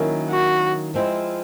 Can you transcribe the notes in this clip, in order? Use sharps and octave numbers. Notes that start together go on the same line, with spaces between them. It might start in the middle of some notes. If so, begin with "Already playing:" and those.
Already playing: D#3 F#3 A#3 C#4 E4
F#4
F3 G#3 C4 E4